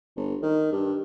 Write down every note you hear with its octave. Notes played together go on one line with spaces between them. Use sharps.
G1
D#3
G2